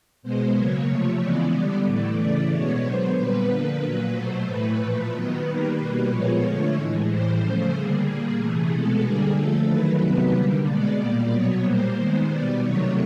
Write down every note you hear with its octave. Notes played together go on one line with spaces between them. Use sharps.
B2 G#3 B3 C5
C#3 F#3 A#3 C#5
C3 F3 A3
C#3 E3 G#3 B3 D5
D3 G3 B3
A2 E3 A3
C#3 E3 A3 D5
B2 G#3 B3 C#5
D3 F#3 B3 C5
A#2 G3 B3 B4
D3 F3 A#3 B4
A#2 F#3 A#3
B2 F#3 A3 C5
A2 E3 A3 B4
A#2 F3 A3 B4
D#3 F#3 B3
D#3 G3 A#3
B2 G3 A#3
A#2 F3 G#3 B3 C#5
D3 F3 A3
A2 E3 G#3
A2 E3 G3 C5
C#3 F3 A3
D3 G3 A#3 G#4
A#2 G3 A#3 G#4
C3 E3 A3
B2 G#3 B3 A4
D3 G3 A#3 G#4
D3 F3 A3 A4
D#3 F#3 A3 B4
C3 D#3 F#3 B3
D3 G3 A#3
B2 G#3 B3 D5
A#2 G3 A#3
B2 F#3 B3 C#5
A#2 G3 A#3 C5
D#3 G#3 B3
B2 G3 B3 D5
C3 D#3 F#3 A3 C#5